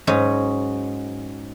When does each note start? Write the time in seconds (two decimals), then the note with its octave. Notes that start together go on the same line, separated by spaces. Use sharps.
0.07 G#2 F#3 C#4 D#4 D#5